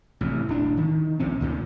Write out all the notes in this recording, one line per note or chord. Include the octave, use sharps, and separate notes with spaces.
A1 C3
D1 D4
D#3
A#1 A#2 C4 C#4
D2 A#2 D#3